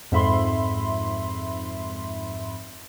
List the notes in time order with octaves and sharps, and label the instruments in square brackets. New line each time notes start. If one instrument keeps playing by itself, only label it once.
[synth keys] F2 G#2 E5 B5 C6